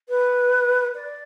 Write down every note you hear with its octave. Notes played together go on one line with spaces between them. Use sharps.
B4
D5